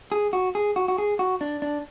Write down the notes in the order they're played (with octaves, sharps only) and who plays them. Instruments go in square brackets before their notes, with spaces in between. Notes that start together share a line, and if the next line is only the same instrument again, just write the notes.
[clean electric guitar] G#4
F#4
G#4
F#4
F#4
G#4
F#4
D4
D4